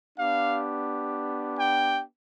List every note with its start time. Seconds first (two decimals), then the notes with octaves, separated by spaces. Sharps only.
0.17 B3 D4 G4 F5
1.59 G5